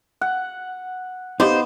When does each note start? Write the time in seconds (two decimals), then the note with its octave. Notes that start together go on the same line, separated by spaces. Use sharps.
0.21 F#5
1.40 B3 D#4 G4 C5 D5 F5